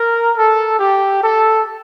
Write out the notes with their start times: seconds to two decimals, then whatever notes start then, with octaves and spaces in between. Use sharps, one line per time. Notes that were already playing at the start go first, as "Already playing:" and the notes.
Already playing: A#4
0.36 A4
0.79 G4
1.23 A4